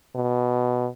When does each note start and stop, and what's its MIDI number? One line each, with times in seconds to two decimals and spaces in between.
0.15 0.88 47